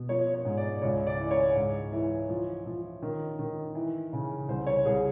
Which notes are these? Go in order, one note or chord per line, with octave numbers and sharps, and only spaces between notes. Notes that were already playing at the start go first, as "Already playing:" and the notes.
Already playing: B2
F3 C#5
C#5
G#2
D5
C#2 C#5
D5
E3
C#5
G#2
E3
F3
F3
D#3
D#3
E3
C#3
C2 C5
C#5
C2 G#4